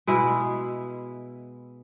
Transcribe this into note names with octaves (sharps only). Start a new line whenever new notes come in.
B2 G#3 E4